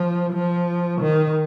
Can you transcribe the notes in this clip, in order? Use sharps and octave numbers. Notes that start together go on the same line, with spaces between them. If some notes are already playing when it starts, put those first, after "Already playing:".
Already playing: F3
F3
D#3